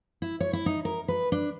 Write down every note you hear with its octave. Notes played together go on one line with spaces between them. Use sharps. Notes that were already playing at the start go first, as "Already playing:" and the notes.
E4
C#5
E4
D#4
A#4
B4
D4